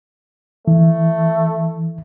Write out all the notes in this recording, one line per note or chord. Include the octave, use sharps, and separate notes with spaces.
E3 A3